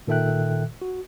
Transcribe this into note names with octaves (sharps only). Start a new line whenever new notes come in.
A#2 D#3 A4 E5 G5 F#6
F#4